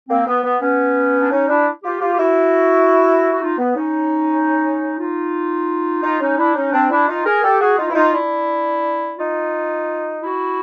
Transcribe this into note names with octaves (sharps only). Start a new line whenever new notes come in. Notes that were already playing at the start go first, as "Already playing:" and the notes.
A#3 C4
B3
B3
B3 C#4
D4
C#4 D#4
D4 E4
F4 G4
F4 G4
G4
E4 F#4
F#4
D#4 F4
B3
C#4 D#4
D#4 F4
D#4 F4
C#4 D#4
D4 E4
C#4 D#4
C4 D4
D4 E4
D#4 F4
G#4 A#4
G4 A4
F#4 G#4
D#4 F4
E4
D#4 F4
D4 E4
D#4 F4
E4 F#4